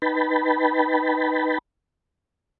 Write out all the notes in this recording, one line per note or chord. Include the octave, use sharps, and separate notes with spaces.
D#4 B4 G5 A5 B5